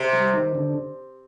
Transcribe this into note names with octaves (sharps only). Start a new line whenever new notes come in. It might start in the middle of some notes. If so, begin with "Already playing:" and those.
Already playing: C3
G3
D#3
D3